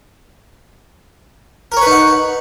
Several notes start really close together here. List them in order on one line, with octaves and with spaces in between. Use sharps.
A#4 C#5 B4 D#4 F#5